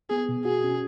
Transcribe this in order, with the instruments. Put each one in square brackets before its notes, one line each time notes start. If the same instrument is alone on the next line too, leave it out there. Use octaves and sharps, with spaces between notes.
[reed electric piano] B3 [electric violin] G#4
[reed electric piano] B2
[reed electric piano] F#4 [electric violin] G#4
[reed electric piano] C#4